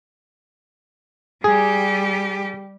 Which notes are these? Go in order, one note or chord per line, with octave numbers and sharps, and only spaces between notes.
G3 G4 G#4